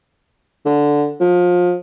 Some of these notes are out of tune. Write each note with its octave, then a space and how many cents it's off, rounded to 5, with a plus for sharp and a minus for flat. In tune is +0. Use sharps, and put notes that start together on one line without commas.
D3 -5
F3 +30